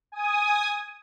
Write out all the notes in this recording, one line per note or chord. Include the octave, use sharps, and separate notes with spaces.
G#5 D#6